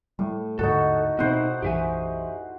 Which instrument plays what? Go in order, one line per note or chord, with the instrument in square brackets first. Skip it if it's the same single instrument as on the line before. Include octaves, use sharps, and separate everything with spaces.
[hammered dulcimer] A2 [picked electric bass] G3
[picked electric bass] D#2 G#2 D3 [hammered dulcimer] D#4 F#4 [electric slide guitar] A4
[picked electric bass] B2 C4 [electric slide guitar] D#4 E4 G#4 [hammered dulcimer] C5 F#5
[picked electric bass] B1 F#2 E3 [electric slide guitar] G4 E5 G#5